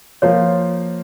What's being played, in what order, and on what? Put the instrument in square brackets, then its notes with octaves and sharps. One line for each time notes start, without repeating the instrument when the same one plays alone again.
[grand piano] F3 A#3 F4 C5 [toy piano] C#5